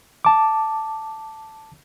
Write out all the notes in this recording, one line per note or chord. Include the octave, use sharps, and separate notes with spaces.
A5 D6